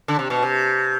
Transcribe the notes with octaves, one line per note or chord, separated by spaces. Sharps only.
D3
C3
B2
C3